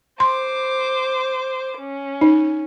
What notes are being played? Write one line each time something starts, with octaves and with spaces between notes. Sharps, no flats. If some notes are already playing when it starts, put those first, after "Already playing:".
C5 C6 D6
C#4
D#4